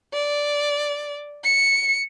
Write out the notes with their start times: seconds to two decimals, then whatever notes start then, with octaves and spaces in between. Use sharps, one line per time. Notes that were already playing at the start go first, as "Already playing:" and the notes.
0.13 D5
1.44 C#7